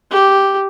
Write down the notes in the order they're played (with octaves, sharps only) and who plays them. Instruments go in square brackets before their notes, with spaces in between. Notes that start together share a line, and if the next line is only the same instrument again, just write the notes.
[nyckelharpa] G4